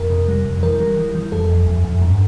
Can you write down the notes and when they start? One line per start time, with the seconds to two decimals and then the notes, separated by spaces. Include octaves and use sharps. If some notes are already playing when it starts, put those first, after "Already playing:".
Already playing: F2 A#4
0.10 C3
0.28 G3
0.45 F2
0.63 E3 A#4
0.80 G3
0.97 E3
1.15 E3
1.32 F2 A4
1.49 F2
1.67 F2
1.85 F2
2.02 G2